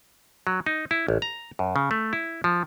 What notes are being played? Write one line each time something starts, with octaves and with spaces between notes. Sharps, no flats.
F#3
D#4
E4
A1
A#5
F#2
C#3
A3
E4
F3